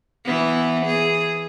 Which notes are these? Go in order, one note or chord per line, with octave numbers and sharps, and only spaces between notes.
E3 B3
G#4